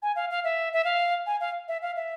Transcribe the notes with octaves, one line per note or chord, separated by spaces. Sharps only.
G#5
F5
F5
E5
E5
F5
G#5
F5
E5
F5
E5